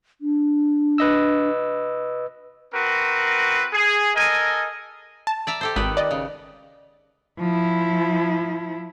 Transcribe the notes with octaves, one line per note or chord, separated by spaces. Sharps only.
D4
B4 D#5 E6
C4 F#4 A#4 B4
G#4
A4 A#4 D#5 G#5
A5
D5 E5 A#5
G4 A4 C5
G#1 D#3 B4
D5 D#5
C#3
F3 E4